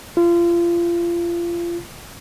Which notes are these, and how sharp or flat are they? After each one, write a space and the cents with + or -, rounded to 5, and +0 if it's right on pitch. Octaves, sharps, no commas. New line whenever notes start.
F4 -30